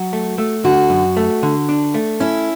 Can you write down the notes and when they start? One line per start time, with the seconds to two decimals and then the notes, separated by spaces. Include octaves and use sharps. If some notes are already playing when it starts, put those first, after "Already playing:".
Already playing: F#3 F#4
0.13 A3
0.38 A3
0.65 D3 F#4
0.90 F#2
1.17 A3
1.43 D3
1.69 D4
1.94 A3
2.20 C#4 E4